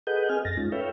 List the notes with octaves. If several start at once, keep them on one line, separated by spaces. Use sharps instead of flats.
G#4 A4 B4 D#5 F#5 G6
C4 G#4 D#5 G#5 F6
F#2 A6 A#6
G#3 C#4 D#4 F4
A4 B4 C#5 E5 F5 G5